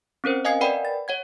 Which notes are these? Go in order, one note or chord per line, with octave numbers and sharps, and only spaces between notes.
C4 C#4 A#4 C5
D#5 F5 G#5 D#6 G#6 C7
A#4 B4 D5 F#5 G5 B5
A6
C#5 F#5 G#6